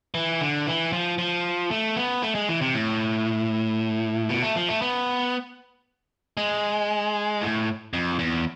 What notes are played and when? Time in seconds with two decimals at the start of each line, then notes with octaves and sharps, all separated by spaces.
0.14 E3
0.41 D3
0.67 E3
0.93 F3
1.18 F3
1.71 A3
1.96 B3
2.23 A3
2.35 G#3
2.49 E3
2.62 C3
2.75 A2
4.29 B2
4.42 A3
4.56 F3
4.69 A3
4.82 B3
6.37 G#3
7.41 A2
7.93 F2
8.19 E2